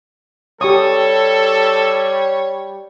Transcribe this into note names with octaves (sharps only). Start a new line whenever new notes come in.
G3 G4 A4 C#5 C#6 D#6